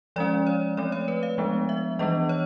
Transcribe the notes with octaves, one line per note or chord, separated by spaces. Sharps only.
F3 G#3 C#4 D5
C#5
F3 A3 C4 D5
C#5
B4
F5
F3 G#3 B3 D4
E5
E3 G3 B3 D4 D#5
C#5